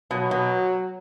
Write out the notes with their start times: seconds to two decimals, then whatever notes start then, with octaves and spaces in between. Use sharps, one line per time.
0.11 B2 F#3
0.31 B2